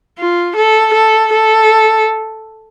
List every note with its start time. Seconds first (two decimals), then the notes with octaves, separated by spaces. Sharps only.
0.18 F4
0.56 A4
0.94 A4
1.33 A4